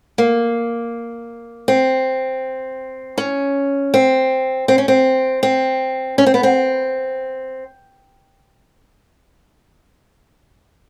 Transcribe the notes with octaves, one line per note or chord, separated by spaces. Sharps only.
A#3
C4
C#4
C4
C4
C#4
C4
C4
C#4
C4
B3
C4